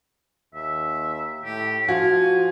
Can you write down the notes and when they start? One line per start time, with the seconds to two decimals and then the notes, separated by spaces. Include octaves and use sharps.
0.55 D#2 E5
1.44 A2 G4
1.88 F3 F4 F#4 G#5